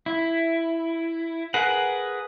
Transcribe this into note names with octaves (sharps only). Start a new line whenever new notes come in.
E4
G#4 A#4 B4 F#5